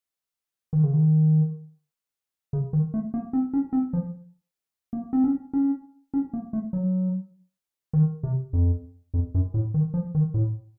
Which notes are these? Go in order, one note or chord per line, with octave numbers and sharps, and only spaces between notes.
D#3
C#3
D#3
C#3
D#3
A3
A#3
C4
C#4
C4
F3
A#3
C4
C#4
C#4
C#4
A#3
A3
F#3
D#3
C3
F2
F2
F#2
A2
D#3
F3
D#3
A2